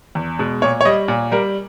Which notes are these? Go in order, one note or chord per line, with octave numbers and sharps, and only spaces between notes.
E2
B2 G#3
A#2 C#5
C#5
G3 D#5
A#2
G3 A#4